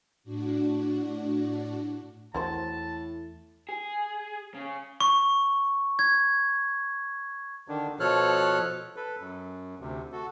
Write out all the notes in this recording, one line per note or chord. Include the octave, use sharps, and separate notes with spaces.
A2 D4 F#4
E2 A2 G#3 F#4 C5 A5
G#4
C#3
C#6
G#6
D3 D#3 D4
B2 F3 A4 C#5 F6 F#6
A4 B4
F#2
D2 C3
F#4 A4